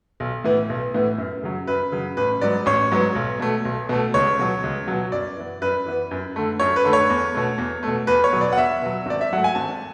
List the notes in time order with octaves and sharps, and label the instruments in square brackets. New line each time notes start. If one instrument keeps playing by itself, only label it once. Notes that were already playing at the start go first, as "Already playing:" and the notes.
[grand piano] B1
A2 E3 B3
B1
A2 E3 B3
F#2
C#3 F#3
F#2 B4
C#3 F#3
A1 B4
G#2 F#3 B3 D5
A1 C#5
G#2 F#3 B3
B1
B2 A3
B1
B2 A3
C#2 C#5
B2 F#3
C#2
B2 F#3
F#2 D5
E3 B3
F#2 B4
E3 B3
F#2
D3 A3
F#2 C#5
B4
D3 A3
C#5
E2
B2 A3
E2
B2 A3
E2 B4
C#5
B2 F#3
D5
F#5
E2 E5
B2 F#3
G#1 D5
E5
G#2 F#3 A3 F#5
G#5
G#1 A5